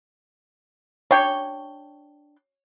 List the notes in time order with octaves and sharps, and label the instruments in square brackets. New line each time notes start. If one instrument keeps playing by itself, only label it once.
[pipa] D4 G5 [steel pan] C#5